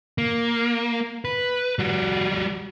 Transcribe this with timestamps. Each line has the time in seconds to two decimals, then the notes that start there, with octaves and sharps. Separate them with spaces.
0.18 A#3
1.25 B4
1.79 G3 F#4